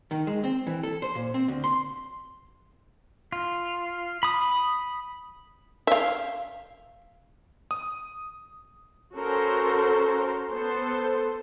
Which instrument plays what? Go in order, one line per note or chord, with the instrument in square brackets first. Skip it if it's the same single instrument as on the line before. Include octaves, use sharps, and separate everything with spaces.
[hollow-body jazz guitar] D#3
G#3
C4
E3
A4
C5
A#2
C4
D2
C6
[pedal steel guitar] F4
B5 D#6
[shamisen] E5 F5
[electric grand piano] D#6
[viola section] C#4 F#4 A4 A#4 C5 C6
B3 A4 C5